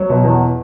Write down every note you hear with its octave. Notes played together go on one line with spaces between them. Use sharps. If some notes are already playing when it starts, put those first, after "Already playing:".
Already playing: F#3
B2
E2